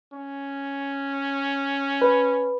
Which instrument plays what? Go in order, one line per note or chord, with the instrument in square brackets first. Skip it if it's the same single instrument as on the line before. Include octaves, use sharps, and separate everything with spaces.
[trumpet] C#4
[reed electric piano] B4